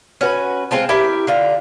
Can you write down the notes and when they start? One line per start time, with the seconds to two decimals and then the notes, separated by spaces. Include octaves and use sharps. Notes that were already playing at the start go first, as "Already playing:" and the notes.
0.21 C#4 F#4 B4
0.71 G#3 C4 F4 A5
0.89 E4 G4 A#4 E5
1.27 D3 F4 A#5